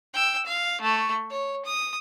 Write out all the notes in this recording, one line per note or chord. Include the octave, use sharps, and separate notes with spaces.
G5 E6
F5
A3 C#6
C#5
D#6